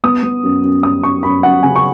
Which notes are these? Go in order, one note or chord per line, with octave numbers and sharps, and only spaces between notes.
B3 D#6
B3
F#2
F#2
F#2 D#6
F#2 C#6
F#2 B5
F#2 F#5
C#3 G#5
C#6